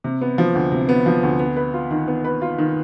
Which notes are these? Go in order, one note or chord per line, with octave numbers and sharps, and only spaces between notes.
C3
B3
F3
D2
C3
B3
F3
D2
B3
B4
F4
D#3
B3
B4
F4
D#3